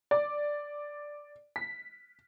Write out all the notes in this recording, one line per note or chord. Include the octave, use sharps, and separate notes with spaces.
D5
B6